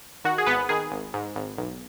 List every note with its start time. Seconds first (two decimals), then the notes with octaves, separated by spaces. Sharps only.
0.24 D#3 F#4
0.38 G#4
0.46 G#1 B3 B4
0.69 D#3 G#4
0.92 G#1
1.14 G#2
1.36 G#1
1.58 B1